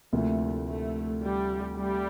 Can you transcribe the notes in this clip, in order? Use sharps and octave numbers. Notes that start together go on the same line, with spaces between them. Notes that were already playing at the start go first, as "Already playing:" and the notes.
D2 C3 F3 A3 A#3 E4
A3
G3
G3